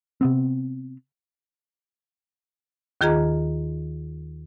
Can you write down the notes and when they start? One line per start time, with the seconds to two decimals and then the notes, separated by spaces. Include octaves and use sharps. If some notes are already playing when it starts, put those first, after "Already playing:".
0.21 C3 B3 C4
3.01 D#2 D#3 F4 G#4 D#5 A#5